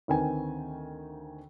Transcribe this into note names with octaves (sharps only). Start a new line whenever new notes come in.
D2 D#3 C4 B4 G#5